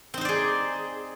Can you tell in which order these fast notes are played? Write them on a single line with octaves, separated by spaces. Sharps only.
C4 D#4 C5 D5 G#4